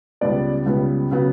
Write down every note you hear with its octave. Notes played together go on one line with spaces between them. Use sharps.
C#2 C#3 G3 B3 D5
C#2 C#3 G3 B3
C#3 F#3 B3